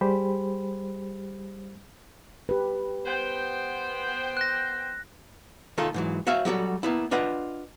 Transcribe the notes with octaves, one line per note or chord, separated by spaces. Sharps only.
G3 G4 G#4 C5 B5
G4 B4
B3 C5 G5
F#6 A#6
D#3 A3 F4 A4
G#2 E3 F#3
F#4 C#5 E5 F5
F#3 G3 F#4 A4
A#3 B3 E4
D4 F4 B4 D#5 F#5